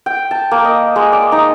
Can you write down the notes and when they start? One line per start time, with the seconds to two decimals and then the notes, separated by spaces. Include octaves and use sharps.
0.06 G5
0.31 A5
0.51 A#3
0.65 D#5
0.96 G#3
1.12 D5
1.32 D#4